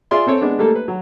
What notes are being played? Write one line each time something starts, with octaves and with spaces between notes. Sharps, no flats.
F4 G#4 D5 E5 C6
C4 A4 C#5
G#3 B3 D4
G3 A3 A#3 A4
B4
F#3